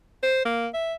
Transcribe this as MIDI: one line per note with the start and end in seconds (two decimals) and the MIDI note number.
0.23 0.41 72
0.45 0.68 58
0.74 0.94 76